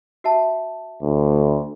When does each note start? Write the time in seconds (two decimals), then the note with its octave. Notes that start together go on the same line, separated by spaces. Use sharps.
0.24 F#4 E5 A5
1.02 D2